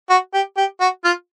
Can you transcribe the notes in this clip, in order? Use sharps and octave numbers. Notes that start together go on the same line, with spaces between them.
F#4
G4
G4
F#4
F4